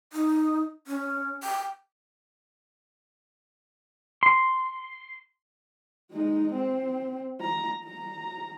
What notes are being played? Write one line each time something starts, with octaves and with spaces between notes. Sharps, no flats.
D#4
C#4
G5
C6
G#3 D#4
C4
A#5
A#5